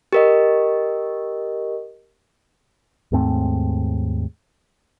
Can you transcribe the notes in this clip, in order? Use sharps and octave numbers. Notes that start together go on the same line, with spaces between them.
G4 A#4 D#5
D#2 G#2 A3 C4